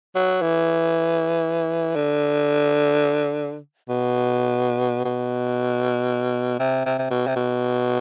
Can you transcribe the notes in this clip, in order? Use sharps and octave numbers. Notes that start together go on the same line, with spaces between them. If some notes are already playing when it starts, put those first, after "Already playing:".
F#3
E3
D3
B2
B2
C3
C3
C3
B2
C3
B2